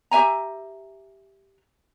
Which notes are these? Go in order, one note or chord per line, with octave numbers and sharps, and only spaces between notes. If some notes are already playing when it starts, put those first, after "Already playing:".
G4 E5 G#5 A#5